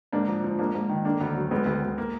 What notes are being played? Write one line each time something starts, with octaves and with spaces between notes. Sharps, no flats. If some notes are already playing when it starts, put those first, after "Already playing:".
G#2 A#3 D4
F3
F3
G#2 A#3 D4
G#2
D#3
D3 A#3 D4
D2
F#3
D2 G#3 B3
D2
D2
A#3